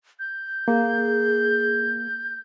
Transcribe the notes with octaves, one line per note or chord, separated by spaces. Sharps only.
G6
A#3 G#4